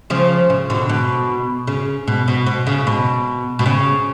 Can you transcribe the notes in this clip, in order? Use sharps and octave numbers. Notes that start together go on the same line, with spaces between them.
C#3 F3
C#3
B2 D3
B2
C#3
B2
B2
B2
C#3
B2
B2
C#3